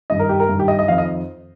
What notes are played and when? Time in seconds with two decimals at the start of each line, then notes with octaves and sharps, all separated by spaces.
0.10 G2 D#3 D#5
0.19 A#4
0.29 G4
0.40 A#4
0.49 G2 D#3
0.59 G4
0.68 D#5
0.79 D#5
0.88 F2 D#3 F5
0.98 D#5